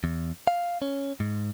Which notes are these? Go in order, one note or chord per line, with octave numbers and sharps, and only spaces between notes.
E2
F5
C#4
G#2